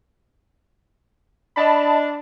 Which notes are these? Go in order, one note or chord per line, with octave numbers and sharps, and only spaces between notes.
D4 D#5 A5 B5